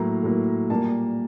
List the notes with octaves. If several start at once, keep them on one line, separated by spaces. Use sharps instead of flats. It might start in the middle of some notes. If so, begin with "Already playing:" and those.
Already playing: A2 F#3 A#3 A#5
A2 F#3 A#3
A#2 G3 A#3 A5